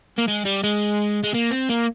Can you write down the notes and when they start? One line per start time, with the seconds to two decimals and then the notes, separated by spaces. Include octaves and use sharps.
0.18 A#3
0.28 G#3
0.45 G3
0.63 G#3
1.23 G#3
1.34 A#3
1.51 C4
1.70 A#3